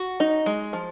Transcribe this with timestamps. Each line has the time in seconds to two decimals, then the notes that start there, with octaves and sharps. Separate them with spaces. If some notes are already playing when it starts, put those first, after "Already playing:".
Already playing: F#4
0.20 D#4
0.46 G#3
0.73 F3